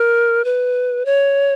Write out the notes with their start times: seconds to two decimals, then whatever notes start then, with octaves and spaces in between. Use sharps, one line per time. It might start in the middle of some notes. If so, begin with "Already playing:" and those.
Already playing: A#4
0.45 B4
1.05 C#5